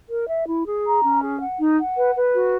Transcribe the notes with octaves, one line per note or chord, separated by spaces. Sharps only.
A#4
E5
E4
G#4
A#5
C#4
G#4
F#5
D#4
F#5
B4
B4
F#4